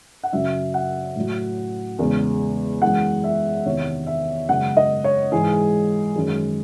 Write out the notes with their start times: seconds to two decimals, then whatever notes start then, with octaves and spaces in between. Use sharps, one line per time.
0.23 F#5
0.33 F#2 C#3 F#3 E5
0.74 F#5
1.16 A2 F#3
1.99 E2 C#3 G#3
2.82 F#2 E3 G#3 F#5
3.24 E5
3.65 E2 C3 D#3 C#5
4.07 E5
4.49 F#2 C#3 G#3 F#5
4.77 D#5
5.04 C#5
5.32 G#2 E3 G#3 G#4
6.15 F#2 D#3 G#3